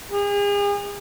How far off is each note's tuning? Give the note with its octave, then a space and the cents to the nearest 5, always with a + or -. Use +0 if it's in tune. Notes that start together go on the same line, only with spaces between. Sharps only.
G#4 -40